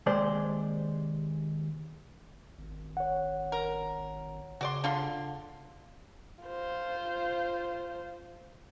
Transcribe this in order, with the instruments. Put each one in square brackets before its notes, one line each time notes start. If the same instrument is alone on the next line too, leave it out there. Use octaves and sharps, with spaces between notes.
[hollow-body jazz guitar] D#2 C3 G#3 C5 D5
[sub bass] G#1
[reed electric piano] C#5 F#5
[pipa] A#4
[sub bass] C#3 [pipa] F#4 D5 C6
[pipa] D3 F4 C6
[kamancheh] F4 C5